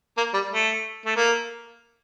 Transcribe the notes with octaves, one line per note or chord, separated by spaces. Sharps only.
A#3
G3
A3
A3
A#3